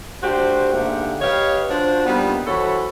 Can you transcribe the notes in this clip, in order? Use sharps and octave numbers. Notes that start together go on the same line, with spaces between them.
A3 D4 F#4 G4 C5
G#2 D3 A3 A#3 G4 F#5
G4 B4 C#5 D#5 F5
D4 F4 F#4 C5
G3 A#3 B3 D4 D#4 F4
E3 F#4 A4 C5 C#5 B5